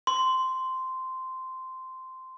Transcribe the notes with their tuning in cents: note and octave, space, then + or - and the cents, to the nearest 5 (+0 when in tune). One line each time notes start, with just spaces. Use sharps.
C6 -10